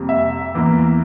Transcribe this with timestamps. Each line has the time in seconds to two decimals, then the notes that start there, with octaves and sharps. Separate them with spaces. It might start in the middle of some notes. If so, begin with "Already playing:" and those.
Already playing: F2 C3 G3 A#3
0.09 E5
0.54 E2 E3 A#3